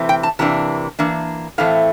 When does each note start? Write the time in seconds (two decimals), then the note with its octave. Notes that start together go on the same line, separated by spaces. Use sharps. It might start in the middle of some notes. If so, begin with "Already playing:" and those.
Already playing: C3 E3 A3 C4
0.09 G5
0.23 A5
0.39 C3 E3 A#3 D4 A5
0.99 E3 A#3 D4
1.58 A2 E3 A3 C4 F5